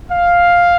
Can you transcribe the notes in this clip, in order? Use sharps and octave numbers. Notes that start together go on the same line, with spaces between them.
F5